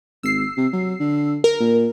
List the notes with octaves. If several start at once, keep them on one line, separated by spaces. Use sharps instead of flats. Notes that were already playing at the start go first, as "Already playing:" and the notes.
G#1 E6 C7
C3
F#3
D3
A#4
A#2